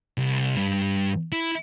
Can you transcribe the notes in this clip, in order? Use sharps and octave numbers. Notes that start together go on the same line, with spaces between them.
C2
G2
E4